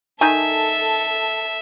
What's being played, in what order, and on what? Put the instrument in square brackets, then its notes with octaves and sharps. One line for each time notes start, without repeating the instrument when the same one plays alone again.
[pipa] D#3 D#4 G#5 [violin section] A4 [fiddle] E5